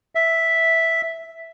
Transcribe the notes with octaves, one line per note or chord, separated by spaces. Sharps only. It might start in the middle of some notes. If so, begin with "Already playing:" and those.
E5